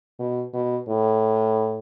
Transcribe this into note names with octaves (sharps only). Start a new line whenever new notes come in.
B2
B2
A2